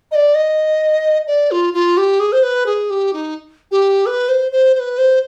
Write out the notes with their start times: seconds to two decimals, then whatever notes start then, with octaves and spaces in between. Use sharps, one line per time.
0.11 D#5
0.15 D5
0.35 D#5
1.27 D5
1.51 F4
1.74 F4
1.97 G4
2.20 G#4
2.32 C5
2.43 B4
2.66 G#4
2.90 G4
3.13 D#4
3.71 G4
4.06 B4
4.29 C5
4.52 C5
4.75 C5
4.80 B4
4.98 C5